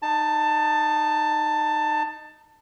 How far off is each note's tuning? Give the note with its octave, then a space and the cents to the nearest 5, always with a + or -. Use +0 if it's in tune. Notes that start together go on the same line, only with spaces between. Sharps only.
D#4 -15 A5 +15